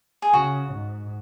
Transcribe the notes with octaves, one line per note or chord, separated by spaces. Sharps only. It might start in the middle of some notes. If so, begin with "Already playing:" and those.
G#4
C#3 F#4
G#2